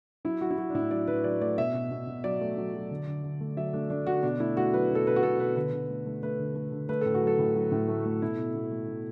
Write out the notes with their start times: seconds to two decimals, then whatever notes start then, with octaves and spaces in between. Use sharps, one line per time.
0.25 F#3 E4
0.41 F#3 F#4
0.51 E4
0.58 F#3 F#4
0.70 D4
0.74 A2 E4
0.91 F#3 D5
1.07 A2 B4
1.24 F#3 D5
1.41 A3 D5
1.58 B2 E5
1.74 B2
1.91 B2
2.07 B2
2.24 F#3 D5
2.41 A3
2.57 F#3
2.74 F#3
2.91 D3
3.07 D3
3.24 D3
3.41 A3
3.57 F#3 E5
3.73 A3 D4
3.90 A3 D4
4.07 D3 F#4
4.23 B2 D4
4.40 A3 E4
4.57 A3 F#4
4.73 F#3 B4
4.90 B2
4.95 A4
5.06 B2 B4
5.16 F#4
5.23 B2 A4
5.39 B2 B4
5.56 D3 B4
5.73 D3
5.90 A3
6.06 A3
6.23 A3 B4
6.40 D3
6.56 A3
6.72 D3
6.89 A3 B4
7.01 A2 A4
7.14 F#4
7.23 F#3 A4
7.39 A2
7.56 F#3
7.72 A2
7.88 A3
8.06 A3
8.21 B2 E4
8.38 B2
8.55 B2
8.72 A3
8.88 B2